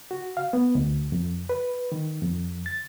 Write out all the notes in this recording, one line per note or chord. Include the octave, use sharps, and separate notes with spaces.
F#4
F5
B3
D2
F2
B4
D#3
F2
A6